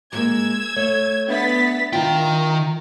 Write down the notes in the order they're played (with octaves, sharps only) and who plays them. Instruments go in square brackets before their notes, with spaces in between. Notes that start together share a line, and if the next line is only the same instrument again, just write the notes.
[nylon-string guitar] G3 G#3 A#3 [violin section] E6 G#6
[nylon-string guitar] A3 [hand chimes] C#5
[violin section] B3 A6 B6 [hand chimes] D4 E5
[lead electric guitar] D#3 G5 [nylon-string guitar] F4 [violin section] A#5